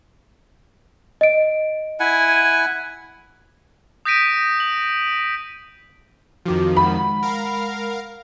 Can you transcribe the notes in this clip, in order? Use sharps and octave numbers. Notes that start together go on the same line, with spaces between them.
D#5 D7
E4 F#5 G#5
D#6 G6 A#6 B6 D7 D#7
F#7
F2 D#3 F3 F#4 D6
G#3 F#5 B5
A#4 F5